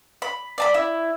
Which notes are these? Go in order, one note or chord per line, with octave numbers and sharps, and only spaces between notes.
B5
D5 A5 B5
E4